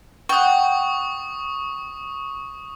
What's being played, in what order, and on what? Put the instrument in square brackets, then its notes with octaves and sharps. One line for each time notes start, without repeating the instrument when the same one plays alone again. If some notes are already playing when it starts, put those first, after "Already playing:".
[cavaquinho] F#5 G5 [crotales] C#6 D#6